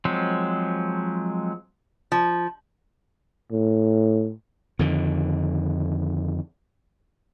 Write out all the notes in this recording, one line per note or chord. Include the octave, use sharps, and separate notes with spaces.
F3 F#3 G#3 C4
F3
A2
F2 D3 D#3